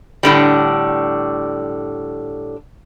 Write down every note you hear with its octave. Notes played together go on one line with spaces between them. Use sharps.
A2 D3 G3